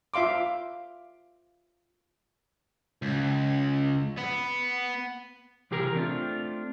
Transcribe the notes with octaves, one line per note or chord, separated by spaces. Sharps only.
F4 E5 F5 C6 D6
C#2
B3
C3 E3 G4 G#4 A#4
A3 C4 D4 D#4 F4